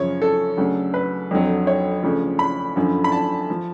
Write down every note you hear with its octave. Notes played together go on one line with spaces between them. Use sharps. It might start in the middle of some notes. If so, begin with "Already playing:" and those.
Already playing: F#2 C#3 F3 C#5
A4
D2 C#3 F#3
B4
F2 D3 F#3
C#5
D2 C#3 F3
B5
F#2 D3 F3
B5
A5
F3